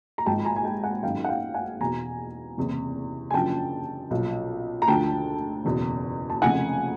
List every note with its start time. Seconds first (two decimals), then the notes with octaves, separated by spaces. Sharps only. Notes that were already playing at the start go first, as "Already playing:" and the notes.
0.18 A#5
0.26 G#1 G#2 F3 G5 A5
0.40 B5
0.45 G#5 A#5
0.56 G#5
0.64 G5 A5
0.84 F#5 G#5
1.03 G#1 F#2 D#3 F5 G5
1.24 F#5
1.29 F5 G5
1.54 F#5 G#5
1.80 E2 B2 G#5 A#5
2.57 F#1 E2 C3 E3
3.31 G#5
3.34 F#1 F#2 D3 F3 G5 A5
4.11 B1 A#2 F3
4.82 A#5
4.87 D2 D3 F3 G5 A5
5.65 F#1 E2 B2
6.30 A5
6.42 F1 F2 C#3 F#5 G#5